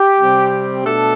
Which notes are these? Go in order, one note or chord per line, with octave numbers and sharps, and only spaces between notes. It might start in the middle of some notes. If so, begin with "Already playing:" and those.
Already playing: G4
C3 G3 C4
B2 A3 D4 A4